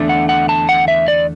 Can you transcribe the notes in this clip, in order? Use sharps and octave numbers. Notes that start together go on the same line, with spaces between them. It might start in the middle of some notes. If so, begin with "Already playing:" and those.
Already playing: E2 D3 A3 D4
F#5
F#5
A5
F#5
E5
D5